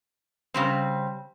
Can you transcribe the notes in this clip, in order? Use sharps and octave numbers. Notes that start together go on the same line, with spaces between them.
C#3 G3 C4